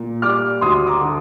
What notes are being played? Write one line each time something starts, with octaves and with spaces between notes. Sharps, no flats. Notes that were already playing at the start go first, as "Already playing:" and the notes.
Already playing: A#2
G3 D6 F6
D2 C6 D#6
A#5 D6
D3